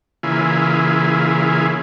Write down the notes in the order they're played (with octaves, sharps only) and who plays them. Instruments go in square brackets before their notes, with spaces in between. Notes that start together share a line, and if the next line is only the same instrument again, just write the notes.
[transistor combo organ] C#3 E3 A#3 E4 F4 G#4